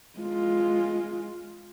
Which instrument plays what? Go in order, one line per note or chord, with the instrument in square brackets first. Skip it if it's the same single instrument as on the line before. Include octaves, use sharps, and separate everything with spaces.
[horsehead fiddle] G#3 F4